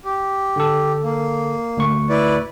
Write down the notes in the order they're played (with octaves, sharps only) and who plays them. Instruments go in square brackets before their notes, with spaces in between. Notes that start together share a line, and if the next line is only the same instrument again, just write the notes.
[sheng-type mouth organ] G4
[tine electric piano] D3 A4
[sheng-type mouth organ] A#3
[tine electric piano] D2 C#6
[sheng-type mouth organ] E4 B4 D5